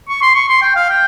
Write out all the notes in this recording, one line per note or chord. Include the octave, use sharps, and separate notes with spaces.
C#6
C6
C#6
C6
G5
F5
G5